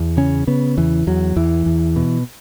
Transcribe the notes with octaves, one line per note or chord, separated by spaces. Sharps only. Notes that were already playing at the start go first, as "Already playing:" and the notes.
Already playing: E2
C#3 C#4
C#3 B3
E2 E3
E2 F#3
E2 E3
E2
B2